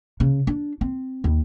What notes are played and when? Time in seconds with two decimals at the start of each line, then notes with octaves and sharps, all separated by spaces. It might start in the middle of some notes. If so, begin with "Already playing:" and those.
0.20 C#3
0.47 D4
0.81 C4
1.24 D#2